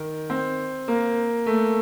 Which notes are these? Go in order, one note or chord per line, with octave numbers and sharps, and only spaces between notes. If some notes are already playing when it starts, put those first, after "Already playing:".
Already playing: D#3
C4
A#3
A3